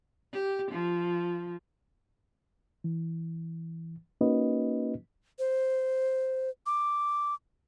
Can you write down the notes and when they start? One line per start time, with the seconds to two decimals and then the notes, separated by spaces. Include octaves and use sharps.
0.33 G4
0.71 F3
2.84 E3
4.21 A#3 C#4 D#4 F#4 B4 D#5
5.39 C5
6.66 D6